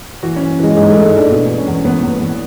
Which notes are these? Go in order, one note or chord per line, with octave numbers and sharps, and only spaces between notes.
E3 F#4
C#4
E3
E3 G#3
G#2 G#3
A3
G#2
G#3
E3 D4
B2 D4
B2
C#4
E2
E2 B3
E2
E2